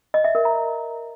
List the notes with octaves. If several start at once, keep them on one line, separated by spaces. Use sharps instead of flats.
D#5
E5
A#4
A#5